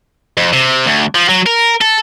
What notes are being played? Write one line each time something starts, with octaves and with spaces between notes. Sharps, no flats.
F2
C3
D2
F3
F#3
A#4
A4